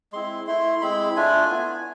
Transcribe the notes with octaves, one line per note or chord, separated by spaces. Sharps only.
G#3 C4 E4 C6
A3 E4 C6
G#3 C4 E4 B5
A3 D4 F4 G#5
B3 E4